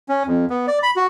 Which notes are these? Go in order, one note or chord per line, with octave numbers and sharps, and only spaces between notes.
C#4
F2
B3
D5
B5
F#4